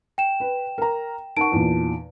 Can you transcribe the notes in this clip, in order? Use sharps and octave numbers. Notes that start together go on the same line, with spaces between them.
G5 E7
B4
A#4 A#5
D#4 A#4 F#5 A5 C#6 D7
E2 A#2